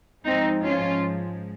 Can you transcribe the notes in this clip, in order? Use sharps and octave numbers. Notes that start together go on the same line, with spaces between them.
G#2 F3 G#3 C4 D#4
C#4 F4